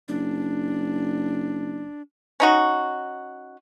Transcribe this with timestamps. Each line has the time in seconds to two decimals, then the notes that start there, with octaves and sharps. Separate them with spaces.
0.08 F#1 D4
2.40 C#4 D#4 F#4